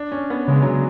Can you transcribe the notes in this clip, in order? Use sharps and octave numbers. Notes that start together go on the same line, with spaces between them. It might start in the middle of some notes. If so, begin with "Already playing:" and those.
Already playing: D4
C#4
B3
C#3 G#3
F#3